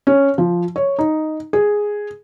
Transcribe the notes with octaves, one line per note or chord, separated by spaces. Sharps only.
C#4
F3
C#5
D#4
G#4